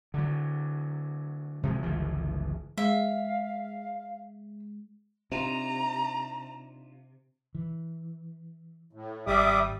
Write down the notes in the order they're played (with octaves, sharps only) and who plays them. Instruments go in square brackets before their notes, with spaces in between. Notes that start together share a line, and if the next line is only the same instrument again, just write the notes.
[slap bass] D3 F#3
C3 F3 G#3
G1 C#2 E3 F3
[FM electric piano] G#3 [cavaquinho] E5 [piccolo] F5
[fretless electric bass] C3 [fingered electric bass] C4 [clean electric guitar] D4 D#4 F4 [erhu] A#5
[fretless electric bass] E3
[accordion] A2
[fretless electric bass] G#1 [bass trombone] G3 [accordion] E5 D6 D#6